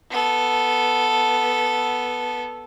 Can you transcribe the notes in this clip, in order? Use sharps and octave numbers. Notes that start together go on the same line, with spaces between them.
B3 A4